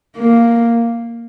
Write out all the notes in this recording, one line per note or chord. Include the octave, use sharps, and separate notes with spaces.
A#3